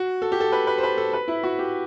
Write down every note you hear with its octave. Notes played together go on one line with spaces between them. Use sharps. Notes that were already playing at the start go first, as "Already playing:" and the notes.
Already playing: F#4
A4
G4
A4
B4
B4
C5
B4
A4
B4
E4
F#4
G4